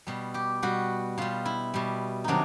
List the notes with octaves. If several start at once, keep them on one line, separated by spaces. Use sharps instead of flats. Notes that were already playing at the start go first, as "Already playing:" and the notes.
B2 G3
G4
B2 G3 F#4
B2 G3 F4
E4
B2 G3
C3 D#3 F#3 D4 D#4